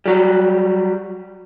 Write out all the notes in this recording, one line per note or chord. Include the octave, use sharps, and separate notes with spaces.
F#3 G3